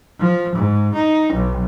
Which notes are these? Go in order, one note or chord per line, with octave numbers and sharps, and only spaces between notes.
F3
G#2
D#4
B1